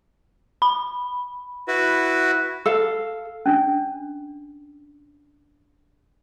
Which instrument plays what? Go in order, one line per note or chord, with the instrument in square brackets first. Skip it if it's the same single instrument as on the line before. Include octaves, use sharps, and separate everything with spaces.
[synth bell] B5
[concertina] E4 F#4 B4
[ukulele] A4 F5
[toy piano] C#4 D4